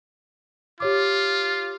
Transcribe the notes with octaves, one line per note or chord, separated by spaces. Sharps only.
F4 G4 C#5 D6